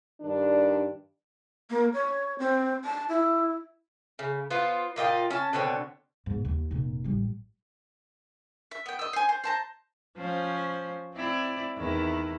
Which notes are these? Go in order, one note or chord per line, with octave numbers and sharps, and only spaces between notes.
G2 D#3 D4
A#3
C#5
C4
A5
E4
C#3
B3 F4 C5
A#2 F4 D#5 G5
C#4 A5
B2 D3 C4 C#5
G#2 B2
D#2
F1 A#2
A1 G3
E5
B3 G5
D#5 E6
C5 G#5
C5
C5 A5 A#5
F3 C#4 C5
C4 E4 D5
E2 D#3 E4